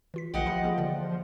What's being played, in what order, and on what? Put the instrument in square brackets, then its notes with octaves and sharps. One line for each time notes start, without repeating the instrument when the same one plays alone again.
[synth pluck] E3 F4 B6
[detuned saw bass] A#1 [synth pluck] D#3 F3 A3 [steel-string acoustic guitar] G4 D#5 F#5
[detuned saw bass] F3 [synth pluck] G5 B5 C#7
[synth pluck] G3 A#3 G#4
D3 E3 D5